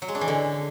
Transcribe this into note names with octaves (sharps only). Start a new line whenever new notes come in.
F#3
G#3
D4
E3
D3